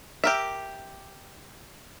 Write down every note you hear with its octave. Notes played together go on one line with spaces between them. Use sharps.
G4 A#4 E5